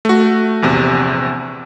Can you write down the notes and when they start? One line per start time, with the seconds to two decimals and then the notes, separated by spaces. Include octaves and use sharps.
0.05 A3 F#4
0.62 A#1 E2 C3